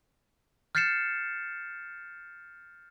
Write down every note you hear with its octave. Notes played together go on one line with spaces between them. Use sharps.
F6 G6 A6 C7 C#7 E7